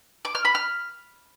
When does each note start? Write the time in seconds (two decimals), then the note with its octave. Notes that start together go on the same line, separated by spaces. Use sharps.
0.25 D6
0.35 F6
0.45 B5
0.55 F6